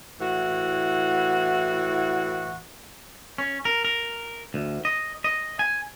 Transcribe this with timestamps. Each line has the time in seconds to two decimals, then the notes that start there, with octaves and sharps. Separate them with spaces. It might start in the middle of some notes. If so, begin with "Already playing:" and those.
0.20 A2 E3 F#4
3.38 C#4
3.65 A#4
3.85 A#4
4.54 D2
4.85 D#5
5.24 D#5
5.59 G#5